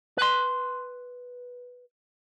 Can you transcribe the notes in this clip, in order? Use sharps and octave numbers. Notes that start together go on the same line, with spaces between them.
B4 C6